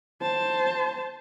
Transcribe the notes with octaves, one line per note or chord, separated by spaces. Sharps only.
C5 A5